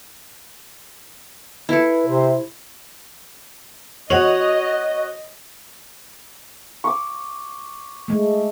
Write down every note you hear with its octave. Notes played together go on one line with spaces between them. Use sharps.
E4 A4 B4
C3 C5
F#4 C#5 D#5 F7 F#7
C#6 D6
G#3 A3